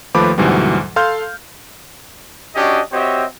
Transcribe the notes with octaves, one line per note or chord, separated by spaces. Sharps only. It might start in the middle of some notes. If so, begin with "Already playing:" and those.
D#2 F3 A3 B4 B5 D6
D2 G#2 B2 E3 F#3 G3
A4 F5 C6 F6 G6
C#4 D4 F#4 G4 D#5
C4 F#4 G4 C#5 D#5 E5